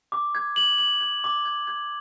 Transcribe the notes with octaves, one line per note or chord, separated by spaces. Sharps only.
D6
G#6
F#7
F#7
G#6
D6
G#6
G#6